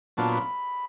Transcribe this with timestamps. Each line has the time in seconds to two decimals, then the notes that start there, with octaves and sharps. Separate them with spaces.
0.17 A#2 F#3 B3 D4 F4 A5
0.33 B5